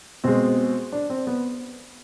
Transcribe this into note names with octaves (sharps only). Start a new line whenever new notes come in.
B2 G#3 C4
D4
C4
B3